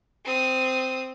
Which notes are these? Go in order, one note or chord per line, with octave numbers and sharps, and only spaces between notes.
C4 D#6